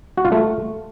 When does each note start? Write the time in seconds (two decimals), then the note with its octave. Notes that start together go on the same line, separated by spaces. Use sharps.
0.17 F#4
0.25 F4
0.32 A3